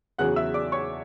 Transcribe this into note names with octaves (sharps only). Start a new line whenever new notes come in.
E2 C#3 F#3 C#4 G#4 F#5 F#6
E5 E6
D5 D6
C#5 C#6